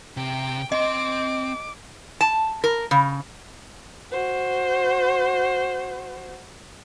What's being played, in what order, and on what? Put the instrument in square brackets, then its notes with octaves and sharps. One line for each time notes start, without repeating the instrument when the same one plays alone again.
[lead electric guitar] C3 [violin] G5
[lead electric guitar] C4 C6 [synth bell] D#5 [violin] D6
[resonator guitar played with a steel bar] A5
A#4
C#3
[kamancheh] F#4 C5